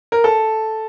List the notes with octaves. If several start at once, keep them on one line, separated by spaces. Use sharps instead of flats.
A#4
A4